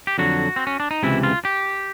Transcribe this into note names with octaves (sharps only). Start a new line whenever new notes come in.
G4
F2 D3 F#3 F#4
C4
C#4
D4
D#4
C#2 C3 E3 E4
F4
G4